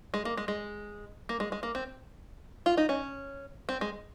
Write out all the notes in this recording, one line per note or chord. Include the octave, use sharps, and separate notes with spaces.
G#3
A#3
G#3
G#3
A#3
G#3
G#3
A#3
C4
F4
D#4
C#4
C4
G#3